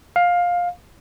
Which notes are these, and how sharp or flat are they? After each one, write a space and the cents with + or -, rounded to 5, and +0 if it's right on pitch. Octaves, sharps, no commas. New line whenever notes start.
F5 +15